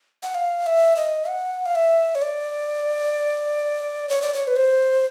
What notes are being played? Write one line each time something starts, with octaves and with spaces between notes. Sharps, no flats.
F#5
F5
E5
D#5
F#5
F5
E5
C#5
D5
C#5
D5
C#5
B4
C5